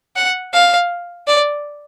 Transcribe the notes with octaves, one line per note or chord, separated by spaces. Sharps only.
F#5
F5
D5